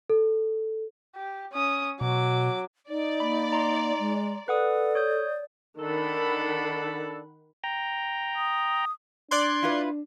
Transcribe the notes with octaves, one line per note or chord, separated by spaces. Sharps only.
A4
G4
C#4 D#6
B2 F#3 D6
D#4 D5
A#3 B5
A#5 C6
G#3
A4 B4 D5 F#5 D#6
C#5 D#6 G6
D#3 D4 A4 F#5 B5
G5 A#5
D#6
D4 D5 C6 F#6 G#6
E4 F4 B4